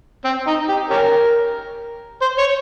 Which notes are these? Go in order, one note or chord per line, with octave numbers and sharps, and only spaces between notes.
C4
D#4
G4
C#4 G4 A#4
C5
C#5